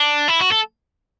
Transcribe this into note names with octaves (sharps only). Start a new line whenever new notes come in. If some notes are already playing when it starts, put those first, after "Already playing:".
Already playing: D4
E4
F#4
A4